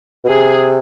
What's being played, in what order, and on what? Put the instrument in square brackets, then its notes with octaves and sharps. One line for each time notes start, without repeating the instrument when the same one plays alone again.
[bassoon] B2
[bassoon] C3 [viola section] G#4